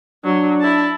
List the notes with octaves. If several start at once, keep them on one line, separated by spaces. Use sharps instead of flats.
F#3 D4
E4 A5